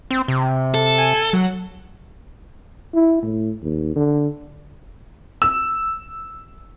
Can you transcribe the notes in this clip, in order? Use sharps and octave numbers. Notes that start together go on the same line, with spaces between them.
C4
C3
A4
G#5
F#3 F#5
E4
A2
D#2
D3
E6